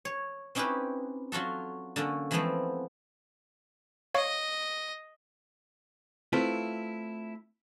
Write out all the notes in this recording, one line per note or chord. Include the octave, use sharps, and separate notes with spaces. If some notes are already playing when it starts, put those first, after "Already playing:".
C#5
C4 C#4 D#4 E4 G4 B4
F#3 F4 F#4 A4
D3 A#3 C#4
E3 F3 G#3 A3 B3 C4
C#5 D#5 F5 C#6
A3 C4 E4 F4 B4